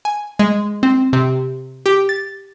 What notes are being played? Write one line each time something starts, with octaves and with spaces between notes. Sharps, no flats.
G#5
G#3
C4
C3
G4
A6